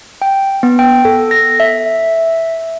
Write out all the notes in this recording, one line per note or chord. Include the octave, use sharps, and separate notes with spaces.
G5
B3
G5
A4
A#6
E5